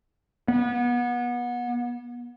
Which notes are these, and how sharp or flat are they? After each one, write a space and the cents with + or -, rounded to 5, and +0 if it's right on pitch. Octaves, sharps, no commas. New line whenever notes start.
B3 -30